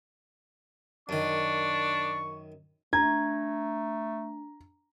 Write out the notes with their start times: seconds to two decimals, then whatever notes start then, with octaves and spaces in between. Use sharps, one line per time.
1.09 F#2 D#3 D4 C#6
2.93 A3 D4 A#5 G#6